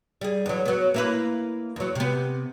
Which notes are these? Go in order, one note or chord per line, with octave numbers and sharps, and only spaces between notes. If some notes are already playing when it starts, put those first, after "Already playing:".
G3 G#4
E2 F#3
F#3 B3
A#3 E4 B4
E2 F#3
C3 B3